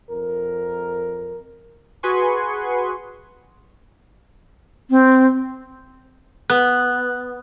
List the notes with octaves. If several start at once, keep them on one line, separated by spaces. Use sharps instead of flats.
F2 A#4
F#4 G#4 B4 G#5 C6 C#6
C4
B3 F#6